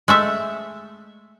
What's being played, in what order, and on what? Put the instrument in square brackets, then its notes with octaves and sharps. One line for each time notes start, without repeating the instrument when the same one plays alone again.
[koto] G#3 A3 E5